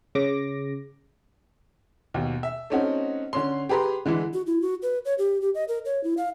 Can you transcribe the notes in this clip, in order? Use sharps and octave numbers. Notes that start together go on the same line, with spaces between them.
C#3 D6 A#6
D#2 B2
E5
A3 C4 C#4 D#4 F#4
D3 C#4 C6
G4 G#4 B4 A#5 C6
D3 E3 G#3 E4
F#4
E4
F#4
B4
C#5
G4
G4
D#5
A#4
C#5
E4
F5